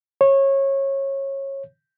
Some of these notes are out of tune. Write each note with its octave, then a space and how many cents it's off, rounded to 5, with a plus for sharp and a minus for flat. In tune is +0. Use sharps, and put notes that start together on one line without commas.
C#5 -20